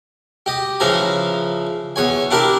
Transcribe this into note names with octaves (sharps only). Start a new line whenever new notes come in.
G4 D#5
C#3 E3 F3 G#5 A#5
E2 C#5 G#5
D4 E4 G4 A#4